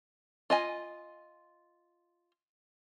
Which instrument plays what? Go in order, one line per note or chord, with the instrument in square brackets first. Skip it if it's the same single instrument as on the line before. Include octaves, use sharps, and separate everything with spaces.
[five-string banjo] F4 D#5 G#5